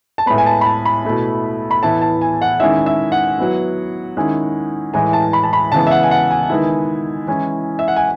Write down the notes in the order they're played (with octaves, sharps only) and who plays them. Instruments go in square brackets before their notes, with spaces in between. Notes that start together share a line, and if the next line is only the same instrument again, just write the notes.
[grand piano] A5
A2 G#3 B3 B5
G#5
A5
B5
A5
B5
B2 A3 E4
B5
A2 E3 B3 E4 A5
A5
G#5
F#5
D#3 G#3 C#4 E4 E5
E5
F#5
F#3 B3 E4
D#3 G#3 C#4 E4
A2 E3 G#3 G#5
A5
B5
A5
B5
C#3 E3 G#3 B3 A5
E5
F#5
G#5
F#5
G#5
D#3 G#3 B3 E4
E3 G#3 C#4 E4
E5
F#5
G#5